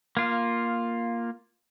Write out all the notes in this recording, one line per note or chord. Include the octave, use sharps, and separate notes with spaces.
A#3 F4